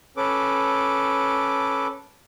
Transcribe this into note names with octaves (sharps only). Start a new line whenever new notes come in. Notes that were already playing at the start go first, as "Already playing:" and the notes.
C#4 A4 B4 D6